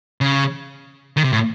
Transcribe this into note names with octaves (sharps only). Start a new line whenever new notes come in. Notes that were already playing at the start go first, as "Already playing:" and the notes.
C#3
D#3
C3
A2